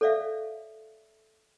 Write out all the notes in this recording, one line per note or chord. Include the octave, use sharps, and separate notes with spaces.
A4 C#5 D5 E5 F5